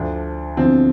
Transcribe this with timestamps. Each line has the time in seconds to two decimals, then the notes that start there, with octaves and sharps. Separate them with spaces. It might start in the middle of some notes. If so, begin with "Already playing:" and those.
Already playing: D2 D3 F3 D4
0.57 E2 D3 F3 C4